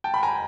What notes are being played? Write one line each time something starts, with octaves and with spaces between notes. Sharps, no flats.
G5 A5
B5
G#5 A#5